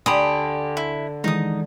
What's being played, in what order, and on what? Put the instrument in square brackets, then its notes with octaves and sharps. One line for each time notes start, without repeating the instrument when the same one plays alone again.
[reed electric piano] D2 G#5 C6 [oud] D3 [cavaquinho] G4 B5 D#6
[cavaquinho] E4
[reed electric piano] D#3 E3 G#3 [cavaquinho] D#4 D#6